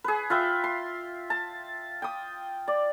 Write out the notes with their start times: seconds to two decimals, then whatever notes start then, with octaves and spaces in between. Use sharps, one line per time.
0.04 G#4 B4
0.30 F4 B4 E5 G5
0.64 C6
1.30 A5
2.02 G5 D#6
2.68 D5